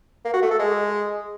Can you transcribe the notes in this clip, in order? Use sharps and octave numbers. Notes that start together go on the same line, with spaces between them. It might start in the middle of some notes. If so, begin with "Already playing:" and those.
A#3
F#4
A3
A4
G#3